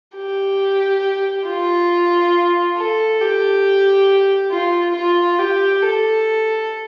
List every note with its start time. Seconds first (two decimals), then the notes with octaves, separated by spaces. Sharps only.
0.16 G4
1.46 F4
2.77 A4
3.21 G4
4.51 F4
4.95 F4
5.39 G4
5.82 A4